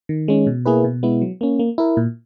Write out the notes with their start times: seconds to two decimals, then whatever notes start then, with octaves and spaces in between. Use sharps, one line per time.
0.09 D#3
0.28 G#3 C#4
0.47 B2
0.66 A#3 E4 G#4 B4
0.84 B2
1.03 G#3 B3 E4
1.22 F#3
1.41 A#3 C#4
1.59 A#3
1.78 E4 A#4
1.97 A#2